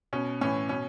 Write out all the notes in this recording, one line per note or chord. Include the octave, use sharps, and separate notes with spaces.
B2 C#4
A2 E3 C#4
B2 C#4